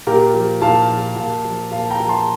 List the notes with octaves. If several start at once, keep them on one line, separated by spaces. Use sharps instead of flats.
A#2 G4 A#4
F3
A#2 F5 A5
F3
A#2
F3
A#2 F5 A5
G5 A#5
F3
A5 C6